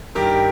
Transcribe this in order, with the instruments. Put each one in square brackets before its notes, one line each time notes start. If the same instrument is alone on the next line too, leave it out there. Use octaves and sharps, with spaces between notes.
[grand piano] G2 D#3 G4 A#4